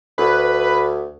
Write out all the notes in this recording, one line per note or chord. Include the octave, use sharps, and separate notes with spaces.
D2 B4